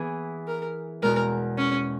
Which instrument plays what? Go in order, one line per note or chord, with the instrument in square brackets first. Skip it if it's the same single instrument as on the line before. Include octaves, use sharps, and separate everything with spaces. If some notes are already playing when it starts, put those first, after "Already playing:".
Already playing: [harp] E3 B3 E4 G#4
[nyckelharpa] A#4
[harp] E2 B2 G#3 [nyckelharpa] A#4
[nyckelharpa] C#4